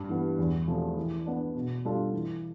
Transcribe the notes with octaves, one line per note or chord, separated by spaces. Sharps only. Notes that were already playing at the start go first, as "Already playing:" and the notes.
Already playing: G2
E3 B3
E2
C3 F3 A3
E3
B3 D4
B2
G3 D4 F4 A4
E3